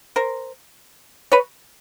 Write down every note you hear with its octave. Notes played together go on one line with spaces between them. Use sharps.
A#4 C5
B4 C#5